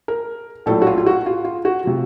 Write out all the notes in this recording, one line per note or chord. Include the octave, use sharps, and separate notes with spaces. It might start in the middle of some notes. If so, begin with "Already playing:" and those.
A#4
A#1 A2 F#3 A4
F#4
F4
F4
F#4
F4
F4
F#4
C3 F3